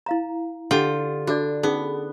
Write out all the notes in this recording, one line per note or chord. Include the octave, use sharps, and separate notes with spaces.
E4 F5 A#5
D3 F4 G4 F#5 G5
D4 F#4 A4 D5
B3 C#4 D#4 G#4